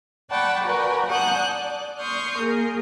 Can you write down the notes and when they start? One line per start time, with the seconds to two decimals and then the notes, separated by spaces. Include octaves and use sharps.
0.29 D5 F#5 G5 A5 B5 C#6
0.64 F#4 A#4 B4 D5 G5 G#5
1.09 F#5 G#5 A5 D#6 F#6 G6
1.37 D5
1.99 C6 C#6 D#6 F6 G6
2.38 A#3 G#4 A#4